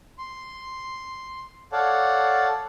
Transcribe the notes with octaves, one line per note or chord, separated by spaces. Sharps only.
C6
A4 C#5 D5 F5 F#5 A5